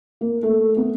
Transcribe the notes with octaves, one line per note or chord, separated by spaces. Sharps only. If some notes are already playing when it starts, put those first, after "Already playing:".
A#3
A3
B3